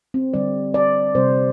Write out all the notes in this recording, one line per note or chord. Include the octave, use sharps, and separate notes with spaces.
C4
D3 G3 D5
D5
C3 G3 C5